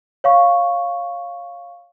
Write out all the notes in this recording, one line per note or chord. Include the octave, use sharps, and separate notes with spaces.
C#5 F5 C#6